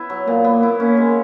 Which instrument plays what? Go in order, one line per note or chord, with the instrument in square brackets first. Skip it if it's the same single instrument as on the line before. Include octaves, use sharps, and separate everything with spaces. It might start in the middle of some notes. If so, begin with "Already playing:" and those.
Already playing: [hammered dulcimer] B3 E4
F#3
[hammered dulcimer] A#2 [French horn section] A#3
[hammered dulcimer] B3
E4
[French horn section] A#3 [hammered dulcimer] C#4
[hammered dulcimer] G#3